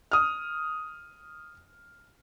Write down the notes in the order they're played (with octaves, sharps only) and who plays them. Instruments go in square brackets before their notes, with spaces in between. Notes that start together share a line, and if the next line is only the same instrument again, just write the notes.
[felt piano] D#6 F6